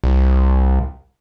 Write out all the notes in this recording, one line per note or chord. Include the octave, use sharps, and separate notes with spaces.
C2